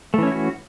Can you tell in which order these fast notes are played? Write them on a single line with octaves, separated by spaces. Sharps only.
A3 E3 C#4 E4 F#4